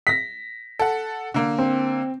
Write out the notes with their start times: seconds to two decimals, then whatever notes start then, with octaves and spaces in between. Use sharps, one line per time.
0.07 A#6 B6
0.79 A4 F#5
1.34 D3 A#3
1.59 C4